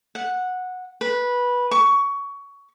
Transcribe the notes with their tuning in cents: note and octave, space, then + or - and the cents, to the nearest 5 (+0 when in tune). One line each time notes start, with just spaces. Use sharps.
F#5 -10
B4 -15
C#6 +20